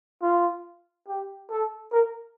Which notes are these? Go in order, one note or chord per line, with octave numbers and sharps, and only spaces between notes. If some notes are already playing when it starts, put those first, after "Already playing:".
F4
G4
A4
A#4